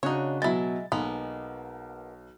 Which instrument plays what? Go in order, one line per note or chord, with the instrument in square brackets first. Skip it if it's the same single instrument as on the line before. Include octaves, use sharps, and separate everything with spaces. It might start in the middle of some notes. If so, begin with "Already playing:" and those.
[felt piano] C#3 D4 F#4 [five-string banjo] D#4 C#5
[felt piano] B2 F#3 A6 [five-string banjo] G#3 E4
[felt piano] B1 [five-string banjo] G#3 A#3 B3